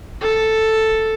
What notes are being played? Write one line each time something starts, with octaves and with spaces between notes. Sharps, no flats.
A4